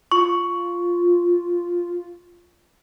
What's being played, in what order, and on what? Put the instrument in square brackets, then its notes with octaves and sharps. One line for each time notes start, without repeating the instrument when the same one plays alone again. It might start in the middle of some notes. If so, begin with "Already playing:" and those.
[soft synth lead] F4 [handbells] C#6